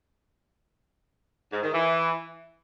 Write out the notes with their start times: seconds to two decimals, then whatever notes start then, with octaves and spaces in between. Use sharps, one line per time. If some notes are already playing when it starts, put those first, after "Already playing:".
1.51 G#2
1.62 D#3
1.73 E3